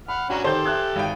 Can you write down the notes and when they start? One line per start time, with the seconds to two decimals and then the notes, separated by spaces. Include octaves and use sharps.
0.08 F#5 B5 F6
0.30 C#4 D4 F#4 F#5 A#5
0.44 D#3 G4 A4 C5 C6 G6
0.66 E5 F#6 G#6
0.96 G#1 G5